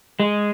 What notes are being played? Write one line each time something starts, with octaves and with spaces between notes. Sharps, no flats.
G#3